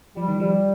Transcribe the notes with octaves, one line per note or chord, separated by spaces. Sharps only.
F3 G3
D#3
F3 G3